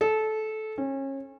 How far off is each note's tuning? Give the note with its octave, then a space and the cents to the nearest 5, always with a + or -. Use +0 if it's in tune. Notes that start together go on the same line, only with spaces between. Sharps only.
A4 -20
C#4 -30